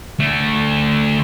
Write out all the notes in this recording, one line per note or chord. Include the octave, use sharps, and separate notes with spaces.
D3 A3